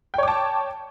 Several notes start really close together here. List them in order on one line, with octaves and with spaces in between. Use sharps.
G5 C#5 D6 A5